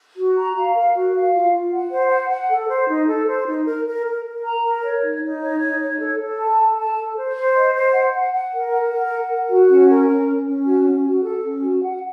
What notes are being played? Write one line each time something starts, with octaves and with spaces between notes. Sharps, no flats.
F#4
A#5
F5
A#4
F#4
F5
F4
F4
F#5
C5
F#5
F#5
A4
C5
D#4
A4
C5
D#4
A#4
A#4
A#4
A#4
A#5
A#4
C#5
D#4
D#4
C#5
D#4
C#5
A4
A4
A5
A4
A5
A4
C5
C5
D#5
C5
F#5
F#5
F#5
A#4
F#5
A#4
F#5
A#4
F#4
C#4
A#4
C#4
C#4
C#4
F#4
C#4
F#4
A4
C#4
F#4
F#5